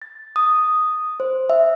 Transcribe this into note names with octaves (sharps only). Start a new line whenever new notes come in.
A6
D#6
C5
E5